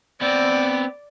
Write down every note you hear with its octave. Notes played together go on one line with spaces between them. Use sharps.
B3 C4 D5